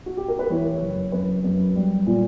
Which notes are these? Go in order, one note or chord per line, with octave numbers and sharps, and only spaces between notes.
F#4
G4
A#4
B4
E3 C#5
F#1
F#2 B4
F#2
G3
A#2